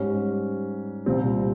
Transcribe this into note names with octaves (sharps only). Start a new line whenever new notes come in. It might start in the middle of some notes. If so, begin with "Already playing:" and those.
Already playing: G#2 G3 C#4
C2 A#2 G3 C4 F4